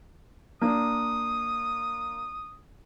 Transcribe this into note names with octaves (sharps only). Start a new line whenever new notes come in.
A#3 D4 D#6